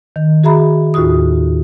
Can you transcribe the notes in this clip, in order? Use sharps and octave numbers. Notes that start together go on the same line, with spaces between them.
D#3
F#4 G#4 E5 A#5 B5
D#2 A2 F4 F#4 D#6